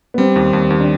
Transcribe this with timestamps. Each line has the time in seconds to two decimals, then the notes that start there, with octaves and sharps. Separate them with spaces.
0.14 B3
0.18 G3 C4
0.36 D#2
0.53 D#2
0.70 D#2
0.80 D4